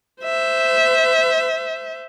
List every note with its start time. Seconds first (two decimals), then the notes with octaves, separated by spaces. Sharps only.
0.23 C5 E5